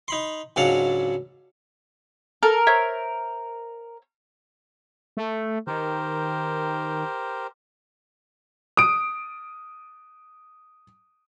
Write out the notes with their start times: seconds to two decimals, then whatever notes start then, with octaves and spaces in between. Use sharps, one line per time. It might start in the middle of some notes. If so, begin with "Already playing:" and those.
0.08 D#4 B5 C6
0.56 C#2 G#2 F#3 D4 F5 F#5
2.43 A4 A#4
2.67 C5 C#5 E5
5.17 A3
5.67 D#3 G4 A#4 C5
8.77 D#6 D7